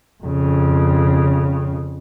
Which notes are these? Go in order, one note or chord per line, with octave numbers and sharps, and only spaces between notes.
F2 C#3